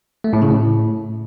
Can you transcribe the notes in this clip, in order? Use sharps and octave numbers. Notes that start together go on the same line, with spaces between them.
A3
A2
C#3
A2